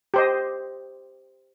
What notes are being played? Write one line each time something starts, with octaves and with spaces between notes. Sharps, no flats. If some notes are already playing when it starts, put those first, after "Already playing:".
G4 C5 D#5